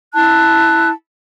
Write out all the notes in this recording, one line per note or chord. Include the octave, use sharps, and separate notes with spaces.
E4 A5 F#6